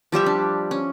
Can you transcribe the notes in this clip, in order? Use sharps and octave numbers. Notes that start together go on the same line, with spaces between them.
F3 G3 G4 E5
D4
C#4